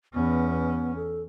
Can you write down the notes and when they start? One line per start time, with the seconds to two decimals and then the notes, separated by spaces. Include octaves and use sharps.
0.14 E2 B3 C#4
0.96 A4